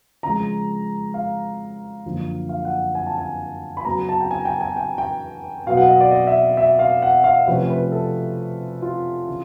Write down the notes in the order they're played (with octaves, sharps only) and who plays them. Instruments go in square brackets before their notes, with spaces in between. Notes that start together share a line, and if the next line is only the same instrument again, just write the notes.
[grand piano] C#3 F3 G#3 A#5
F5
F#2 D3 F3 A#3
F5
F#5
G#5
A5
G#5
B5
C#3 F#3 B3 A#5
A5
G5
G#5
G5
G#5
G5
G5
B2 F#3 B3 F5
F#5
D#5
D5
D#5
E5
E5
F5
F#5
F5
C3 F3 A3 C#4 B4
B4
A4
F4
C#3 E3